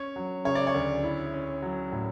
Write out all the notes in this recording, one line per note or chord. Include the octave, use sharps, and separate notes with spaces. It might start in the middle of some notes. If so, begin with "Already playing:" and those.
Already playing: C#4 C#5
F#3
C#3 C#5
D5
C#5
D2
E4
C#4
F#3
A2